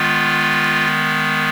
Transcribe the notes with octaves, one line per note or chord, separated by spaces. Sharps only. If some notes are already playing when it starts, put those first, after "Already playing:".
Already playing: D#3 G#3 B3 F4